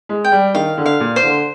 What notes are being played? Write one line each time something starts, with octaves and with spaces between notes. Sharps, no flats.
G#3
G5
G3
D#3 F5
D3
F5
A#2
C5
D3